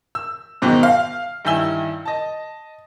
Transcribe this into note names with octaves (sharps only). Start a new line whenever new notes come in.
E6
G#2 B2 D#3 G#3 C4
F5
G2 D#3 E4 G#5 E6 G7
D#5 A5